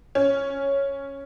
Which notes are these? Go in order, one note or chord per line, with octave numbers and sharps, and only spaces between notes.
C#4